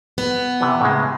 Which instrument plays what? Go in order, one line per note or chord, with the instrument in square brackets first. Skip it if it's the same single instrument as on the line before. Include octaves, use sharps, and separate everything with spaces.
[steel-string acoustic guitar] B3
[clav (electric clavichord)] C3 E3
A2 C#3 G#3